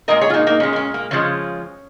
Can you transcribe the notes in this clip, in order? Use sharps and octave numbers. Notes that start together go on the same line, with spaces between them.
A#2 G#3 A#4 D#5
G#4 C#5
F4
A#3 D#4
A#3 D#4
A#2 G#3 C#4
A#3
C#4
A#3
C#3 F3 G#3 C#4